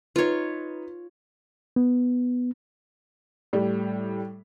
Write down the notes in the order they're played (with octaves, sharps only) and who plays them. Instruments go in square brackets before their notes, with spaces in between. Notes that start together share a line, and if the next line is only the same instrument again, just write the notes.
[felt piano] D#4 B4 [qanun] F4 C#5
[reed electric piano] B3
[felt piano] A2 G3